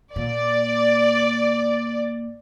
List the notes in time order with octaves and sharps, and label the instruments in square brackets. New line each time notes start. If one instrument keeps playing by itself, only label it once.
[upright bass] A#2 [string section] D5